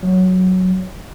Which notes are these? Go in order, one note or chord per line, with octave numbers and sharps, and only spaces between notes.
F#3